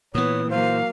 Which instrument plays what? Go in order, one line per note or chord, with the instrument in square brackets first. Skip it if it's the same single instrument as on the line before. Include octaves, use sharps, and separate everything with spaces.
[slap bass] A#2 E3 [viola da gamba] B3 [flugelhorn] C#5 [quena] D#6
[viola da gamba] F#3 A#3 [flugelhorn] C5 [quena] F5